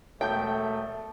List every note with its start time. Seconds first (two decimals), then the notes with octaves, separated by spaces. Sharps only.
0.21 E1 A3 A4 G5 G6